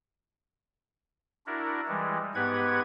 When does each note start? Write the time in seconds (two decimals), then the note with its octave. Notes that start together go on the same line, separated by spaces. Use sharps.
1.47 D4 E4 F#4 A#4
1.88 E3 G3 G#3
2.35 G#2 B3 G4 B4 F#5 G#6